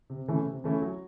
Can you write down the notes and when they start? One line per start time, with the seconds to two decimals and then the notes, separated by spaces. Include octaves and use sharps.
0.10 C3
0.28 E3 A3 C#4 E4
0.46 C3
0.64 E3 A3 C#4 E4
0.82 F#3